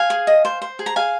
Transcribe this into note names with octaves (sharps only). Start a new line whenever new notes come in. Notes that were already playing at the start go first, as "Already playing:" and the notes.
Already playing: F5 G#5
G#4
D#5
C5
C5
G#4
A#5
G#4 F5 G#5